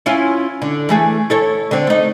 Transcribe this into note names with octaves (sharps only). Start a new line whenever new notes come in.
C#4 E4 F4
D3
E3 A3 G#4
E4 A4 C#5
D3 C4
A3 D#4